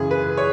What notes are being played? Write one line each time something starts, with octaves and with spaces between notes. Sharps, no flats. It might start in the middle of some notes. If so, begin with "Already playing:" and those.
Already playing: F#2 C#3 E3 G#4
B4
C#5